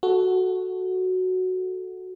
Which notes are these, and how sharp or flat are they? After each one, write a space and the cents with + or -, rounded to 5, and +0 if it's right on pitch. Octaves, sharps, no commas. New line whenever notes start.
F#4 +0 A4 -5